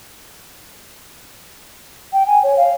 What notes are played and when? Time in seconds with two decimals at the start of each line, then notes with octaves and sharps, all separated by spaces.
2.13 G5
2.27 G#5
2.43 C#5
2.57 F5